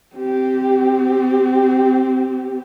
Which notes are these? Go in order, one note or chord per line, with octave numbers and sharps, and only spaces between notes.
C4 G4